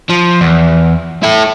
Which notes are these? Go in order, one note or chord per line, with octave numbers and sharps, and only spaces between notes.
F3
E2
E4 A4